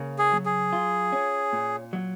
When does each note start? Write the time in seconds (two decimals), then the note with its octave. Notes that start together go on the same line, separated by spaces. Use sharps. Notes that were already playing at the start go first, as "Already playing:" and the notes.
Already playing: C#3 A#3
0.19 G#4
0.32 F#3
0.46 G#4
0.73 F4
1.12 C#4
1.53 A#2
1.93 F#3